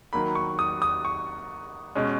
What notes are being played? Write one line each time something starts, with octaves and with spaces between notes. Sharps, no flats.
D#3 F#3 A#3 B5
C#6
D#6
D#6
C#6
B2 G#3 C#4